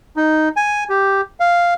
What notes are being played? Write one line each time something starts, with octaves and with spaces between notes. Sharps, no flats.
D#4
G#5
G4
F5